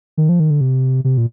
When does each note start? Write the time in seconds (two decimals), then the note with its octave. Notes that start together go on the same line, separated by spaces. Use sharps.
0.18 D#3
0.29 F3
0.40 D#3
0.50 D3
0.61 C3
1.04 C3
1.17 A#2